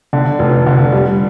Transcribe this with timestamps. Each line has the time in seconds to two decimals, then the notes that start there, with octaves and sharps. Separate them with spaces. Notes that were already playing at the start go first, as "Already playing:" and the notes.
0.13 D3
0.39 F1
0.66 D3
0.92 G3